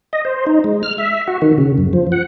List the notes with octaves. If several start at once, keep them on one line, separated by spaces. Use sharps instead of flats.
D#5
C5
D#4
G#3
F6
E5
F#4
D#3
C#3
F#2
F3
F#5